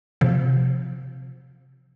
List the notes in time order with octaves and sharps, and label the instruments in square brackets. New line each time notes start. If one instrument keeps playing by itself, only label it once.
[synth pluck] C3 F3